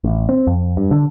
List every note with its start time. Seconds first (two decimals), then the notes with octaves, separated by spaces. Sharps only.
0.04 A1
0.29 C4
0.47 F2
0.77 G2
0.91 D3